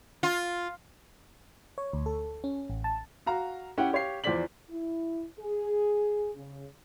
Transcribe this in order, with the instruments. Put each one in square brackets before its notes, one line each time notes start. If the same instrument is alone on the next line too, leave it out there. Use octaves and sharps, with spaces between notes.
[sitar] F4
[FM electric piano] C#5
D2
A4
C#4
A1
A5
[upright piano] F#4 F5 A#5
C#4 E4 G4 F#5 G5
G4 C#5 F5 C7
E2 F3 C5 D5 B6 F#7
[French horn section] E4
G#4
C#3